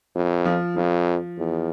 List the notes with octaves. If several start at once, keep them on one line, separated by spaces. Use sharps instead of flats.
F2
F3
F2 F3
E2